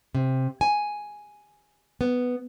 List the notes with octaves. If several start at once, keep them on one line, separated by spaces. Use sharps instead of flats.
C3
G#5
B3